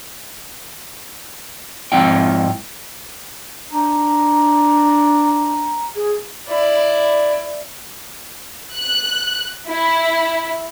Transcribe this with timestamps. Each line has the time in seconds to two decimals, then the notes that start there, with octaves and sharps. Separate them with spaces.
1.92 G#2 F3 C4 E4 G5
3.72 D4 A#5
5.96 G#4
6.48 E4 D5
8.74 F#6
9.67 E4